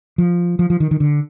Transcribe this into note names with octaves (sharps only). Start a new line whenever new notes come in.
F3
F3
F3
D#3
D#3
D3